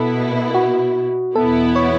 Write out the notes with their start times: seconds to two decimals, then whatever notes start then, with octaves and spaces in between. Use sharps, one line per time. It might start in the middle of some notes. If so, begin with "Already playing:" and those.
Already playing: B2 B3 E4 A4
0.54 F#4
1.36 E2 B2 B3 E4 A4
1.76 C#5